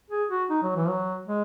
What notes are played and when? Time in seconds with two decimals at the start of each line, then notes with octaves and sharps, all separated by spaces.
0.10 G#4
0.30 F#4
0.50 D#4
0.63 F#3
0.76 E3
0.88 F#3
1.28 G#3